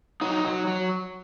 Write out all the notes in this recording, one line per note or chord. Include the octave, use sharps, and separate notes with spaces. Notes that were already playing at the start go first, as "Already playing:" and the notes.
F#3 D#4
F#3
F#3